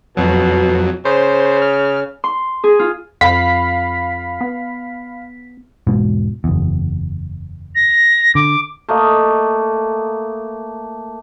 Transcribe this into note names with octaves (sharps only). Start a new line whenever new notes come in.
F2 B2 F#3
C#3 C5
F6
C6
G#4
F4
F2 F5 B5 B6
B3
E1 G#2 B2
F#1 E2
A#6
D3 D6
A3 A#3 D#5